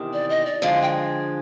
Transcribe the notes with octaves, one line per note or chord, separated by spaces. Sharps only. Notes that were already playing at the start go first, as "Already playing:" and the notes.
Already playing: E2 C3 D#3
D5
D#5
D5
D3 F3 G#3 F5
G5